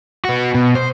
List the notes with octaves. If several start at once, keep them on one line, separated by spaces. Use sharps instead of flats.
B3 F#4
B2
C5